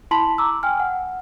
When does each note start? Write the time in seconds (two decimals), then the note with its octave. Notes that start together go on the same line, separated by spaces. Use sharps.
0.11 E4 A5 B5 C6 B6 F#7
0.38 A#5 D6 E6
0.63 G5 G#5 F6
0.80 F#5